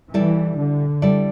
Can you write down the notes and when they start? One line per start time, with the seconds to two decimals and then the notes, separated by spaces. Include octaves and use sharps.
0.13 E3 G3 E4 A4 D5
0.57 D3
1.02 G3 E4 A4 D5